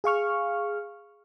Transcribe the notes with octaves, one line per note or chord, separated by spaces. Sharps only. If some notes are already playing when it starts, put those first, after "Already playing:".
G#4 F5 C#6 F6